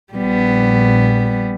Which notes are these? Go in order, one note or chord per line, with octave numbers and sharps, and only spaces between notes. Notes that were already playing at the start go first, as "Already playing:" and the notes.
A#1 G3 B3